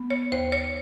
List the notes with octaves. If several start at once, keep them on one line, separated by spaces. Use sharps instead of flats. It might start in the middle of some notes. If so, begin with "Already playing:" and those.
Already playing: B3
C#5
D#2 C5
C#5